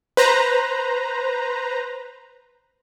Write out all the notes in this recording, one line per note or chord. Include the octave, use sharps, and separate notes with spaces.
B4 C5 A#5